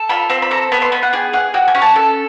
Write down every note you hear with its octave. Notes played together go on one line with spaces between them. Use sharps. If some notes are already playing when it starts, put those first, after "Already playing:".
Already playing: A4
F4 B5
C4 B5
B5
A4 A#5
B3 B5
C6
B3 B5
F#5
G#4 G5
G#4 F#5
F#4 G5
G#5
C#4
A5
A4